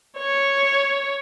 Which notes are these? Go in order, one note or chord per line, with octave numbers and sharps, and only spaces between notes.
C#5